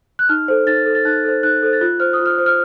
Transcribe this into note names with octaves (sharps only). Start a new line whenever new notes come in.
F#6
D#4 F6
A4 C5
D#4 A6
A4 C5
A6
D#4 F#6
A4 C5
D#4 F#6
A4 C5
A6
F4 F#6
C5 F6
D#6
F4
F6
C5
F6